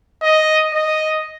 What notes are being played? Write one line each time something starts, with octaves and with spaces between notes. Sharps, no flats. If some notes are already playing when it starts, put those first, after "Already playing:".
D#5
D#5